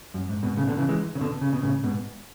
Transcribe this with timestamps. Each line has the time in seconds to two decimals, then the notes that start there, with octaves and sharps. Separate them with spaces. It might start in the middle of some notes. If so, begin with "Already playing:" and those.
0.14 F#2
0.29 G#2
0.43 G#2 B2
0.57 A2 C#3
0.67 B2 D3
0.78 C#3 E3
0.89 E3 G#3
1.15 C#3
1.21 B2 D3
1.41 C#3
1.53 B2
1.63 A2 C#3
1.83 G#2 B2